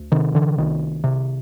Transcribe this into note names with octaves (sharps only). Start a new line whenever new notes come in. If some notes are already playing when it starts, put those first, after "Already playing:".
Already playing: D2
C3 D#3
D3 E3
C2 D#3
C3